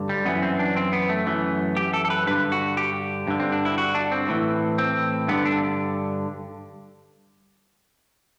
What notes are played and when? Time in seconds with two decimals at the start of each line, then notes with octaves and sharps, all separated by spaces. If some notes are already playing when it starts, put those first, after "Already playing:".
Already playing: G2 D3
0.09 G3
0.26 F#2 E3 B3
0.42 C4
0.59 D4
0.76 C4
0.93 B3
1.10 A3
1.26 F#2 E3
1.77 G4
1.93 A4
2.05 A4
2.10 B4
2.27 G2 D3 B4
2.52 F#4
2.77 G4
3.28 G2 D3
3.40 C4
3.52 D4
3.65 E4
3.78 F#4
3.95 D4
4.12 C4
4.28 A2 E3
4.78 C4
5.28 G2 D3 B3
5.45 D4